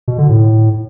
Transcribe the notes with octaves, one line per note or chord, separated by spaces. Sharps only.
B2
D3
A2